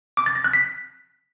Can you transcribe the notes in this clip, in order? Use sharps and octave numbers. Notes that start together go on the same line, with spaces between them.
D6
A6
A#6
F#6
B6